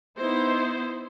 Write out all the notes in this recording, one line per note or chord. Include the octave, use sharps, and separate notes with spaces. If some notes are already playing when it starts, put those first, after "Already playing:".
B3 D#4 E4 C5